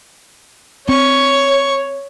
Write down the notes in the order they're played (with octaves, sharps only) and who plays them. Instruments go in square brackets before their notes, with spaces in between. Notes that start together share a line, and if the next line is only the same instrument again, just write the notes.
[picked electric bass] C4 [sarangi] C#5 [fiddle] C#6